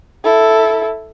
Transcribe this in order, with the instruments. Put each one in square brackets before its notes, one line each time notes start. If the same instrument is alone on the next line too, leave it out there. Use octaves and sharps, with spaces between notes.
[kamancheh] E4 A4